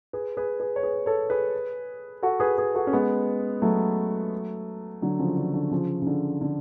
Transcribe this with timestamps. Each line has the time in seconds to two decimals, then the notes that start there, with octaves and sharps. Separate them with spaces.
0.13 G#4 B4
0.37 G#4 B4
0.60 G#4 B4
0.76 C#5
0.83 G#4 B4
1.06 A4 C#5
1.30 G#4 B4
2.23 F#4 A4
2.40 G#4 B4
2.58 G#4 B4
2.75 F#4 A4
2.87 C#4
2.93 G#3 B3
3.62 F#3 A3
5.02 D3 F#3
5.19 C#3 F3
5.38 D3
5.54 D3
5.71 C#3 F3
6.02 C#3
6.07 D3
6.41 D3